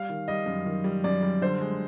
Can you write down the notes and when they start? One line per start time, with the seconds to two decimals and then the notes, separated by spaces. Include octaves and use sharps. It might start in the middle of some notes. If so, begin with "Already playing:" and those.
Already playing: G3 F5
0.09 D#3
0.28 G3 D#5
0.46 F#2
0.66 D#3
0.84 G3
1.04 F#2 D5
1.23 G3
1.42 D3 C5
1.61 G#3